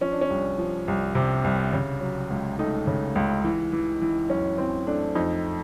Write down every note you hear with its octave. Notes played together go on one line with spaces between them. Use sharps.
F3 C#4
D4
C#4
C2
F3
C2
C3
C2
C#3
F#3
C#2
A3 D#4
C#3
C#2
E3
E3
E3
F#2 C#4
E3 C4
A3 D4
F2 D#4